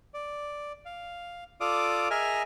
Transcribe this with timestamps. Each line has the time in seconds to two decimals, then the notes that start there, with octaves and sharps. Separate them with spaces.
0.14 D5
0.85 F5
1.61 F4 A4 D5 F5 D6 D#6
2.11 G#4 A#4 D#5 E5 G#5 F6